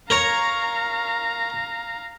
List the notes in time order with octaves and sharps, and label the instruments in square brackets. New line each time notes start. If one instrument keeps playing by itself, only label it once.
[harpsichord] A#4 C#5 [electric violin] F5 A#5